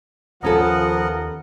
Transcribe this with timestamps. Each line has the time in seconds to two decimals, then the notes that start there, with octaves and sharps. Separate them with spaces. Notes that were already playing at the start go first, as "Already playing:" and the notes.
0.43 D#2 F3 B3 C#4 A4 A#4 D#5 F#5